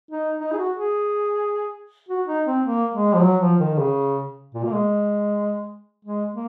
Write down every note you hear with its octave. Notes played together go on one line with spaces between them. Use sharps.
D#4
D#4
G#4
F#4
G#4
F#4
D#4
C4
A#3
G#3
F3
F#3
F3
D#3
D#3
C#3
A#2
A#3
G#3
G#3
A#3